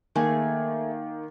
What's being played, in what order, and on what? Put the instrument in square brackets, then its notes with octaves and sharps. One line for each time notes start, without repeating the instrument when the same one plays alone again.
[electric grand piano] D#3 A#3 [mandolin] A3 G#4